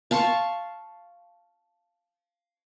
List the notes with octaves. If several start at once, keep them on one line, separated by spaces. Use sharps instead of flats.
F5 A5 C6 C#6